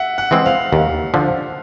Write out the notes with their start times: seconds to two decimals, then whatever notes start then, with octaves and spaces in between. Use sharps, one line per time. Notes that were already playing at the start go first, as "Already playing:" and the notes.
Already playing: E5 F#5
0.18 F#5
0.31 E3 G#3 C4
0.46 F5
0.73 D#2
1.14 D3 F3